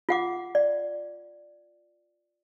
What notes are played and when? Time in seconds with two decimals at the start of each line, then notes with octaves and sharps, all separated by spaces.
0.09 F4 F#5 D6
0.55 D5